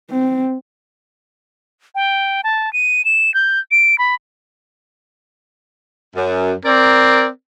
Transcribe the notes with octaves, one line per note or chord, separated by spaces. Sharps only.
C4
G5
A5
D#7
E7
G6
D7
B5
F#2
C4 A#4 D5